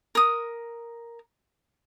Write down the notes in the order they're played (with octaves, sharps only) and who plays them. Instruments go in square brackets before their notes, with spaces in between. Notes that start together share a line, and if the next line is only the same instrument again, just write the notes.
[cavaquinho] A#4 D#6